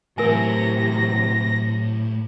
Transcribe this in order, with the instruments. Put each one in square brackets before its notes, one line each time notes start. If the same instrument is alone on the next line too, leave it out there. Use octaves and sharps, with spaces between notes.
[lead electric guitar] A2 [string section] C3 E3 F#3 [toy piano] A#4 G#5 [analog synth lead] A#6